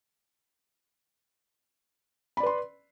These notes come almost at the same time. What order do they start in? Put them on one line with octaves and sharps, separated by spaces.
B5 D5 B4 C6